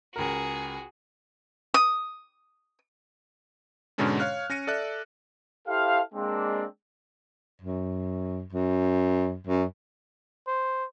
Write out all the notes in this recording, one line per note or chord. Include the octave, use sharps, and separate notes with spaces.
C#2 F#4 G#4 A#4
D#6
G#2 B2 D3 G#3 C#4 D4
C#5 F5 F6 F#6
C#4 A#6 C#7 D#7
A4 D5 E5 F#6
E4 G4 A4 C5 F5
G#3 A#3 C4 D4
F#2
F#2
F#2
C5